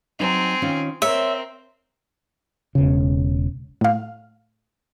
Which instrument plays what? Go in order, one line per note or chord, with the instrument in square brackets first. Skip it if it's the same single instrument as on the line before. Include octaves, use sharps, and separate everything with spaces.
[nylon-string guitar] F#3 D#4 [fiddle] C4 G#5
[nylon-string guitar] D#3 C#4 F4
[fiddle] C4 A#4 [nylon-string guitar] C#5 [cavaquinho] E5
[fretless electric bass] E1 C#3
[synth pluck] A2 F5